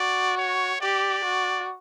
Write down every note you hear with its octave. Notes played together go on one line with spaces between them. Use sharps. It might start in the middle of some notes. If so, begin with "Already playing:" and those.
Already playing: F#4 D5
C#5
G4 D5
F#4